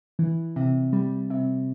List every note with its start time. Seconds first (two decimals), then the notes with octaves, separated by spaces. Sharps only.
0.19 E3
0.56 C3
0.93 G3
1.30 C3